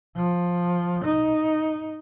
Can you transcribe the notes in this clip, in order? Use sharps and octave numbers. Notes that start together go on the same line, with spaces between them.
F3
D#4